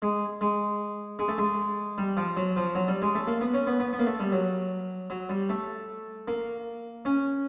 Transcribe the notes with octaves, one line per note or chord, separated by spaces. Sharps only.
G#3
G#3
G#3
A3
G#3
G3
F3
F#3
F3
F#3
G3
G#3
A3
A#3
B3
C#4
B3
B3
B3
A#3
A3
G3
F#3
F#3
G3
A3
A#3
C#4